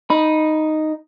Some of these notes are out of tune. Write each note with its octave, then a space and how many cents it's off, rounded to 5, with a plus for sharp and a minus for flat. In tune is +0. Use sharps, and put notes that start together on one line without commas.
D#4 +0 B5 -15